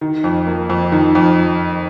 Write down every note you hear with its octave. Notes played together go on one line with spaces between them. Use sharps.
D#3
F2
A#3
F2
D#3
F2